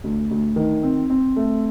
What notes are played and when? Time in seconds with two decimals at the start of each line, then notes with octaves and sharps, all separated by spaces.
0.04 D2
0.31 D2
0.56 D#3
0.83 C4
1.10 C4
1.36 A3